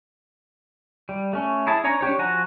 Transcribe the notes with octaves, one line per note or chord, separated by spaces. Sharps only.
G3
A3 C#4
E4 G#4 A5
C#4 D4 C#5 G#5 A#5
C#4 D4 G4 C#5
F3 F#4 F#5 G#5 A#5